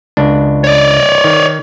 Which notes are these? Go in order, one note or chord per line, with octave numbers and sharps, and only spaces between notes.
C#2 D4
C#5 D5
D#3